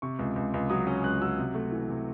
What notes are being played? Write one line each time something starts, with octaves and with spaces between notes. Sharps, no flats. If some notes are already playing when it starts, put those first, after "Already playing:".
C3 C#6
C#2
C#2
C#2
F#3 D#6
C#4
C#2 F#6
F#3 E6
C3
A3
E3
C3